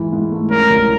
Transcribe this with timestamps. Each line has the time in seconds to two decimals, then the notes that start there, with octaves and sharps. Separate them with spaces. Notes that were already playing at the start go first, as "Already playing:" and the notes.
Already playing: G#2 E3
0.13 G#2
0.32 A3
0.50 C#4 A#4
0.70 C2